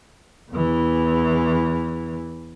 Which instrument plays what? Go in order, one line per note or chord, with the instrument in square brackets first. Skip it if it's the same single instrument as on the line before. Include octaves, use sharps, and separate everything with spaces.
[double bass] E2 E3